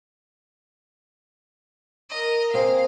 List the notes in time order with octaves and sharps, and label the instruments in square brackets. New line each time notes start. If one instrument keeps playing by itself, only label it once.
[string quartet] A#4 D#5
[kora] A#3 C4 G#4 [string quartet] F5